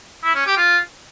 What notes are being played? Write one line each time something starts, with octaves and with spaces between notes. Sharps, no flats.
E4
C#4
G4
F4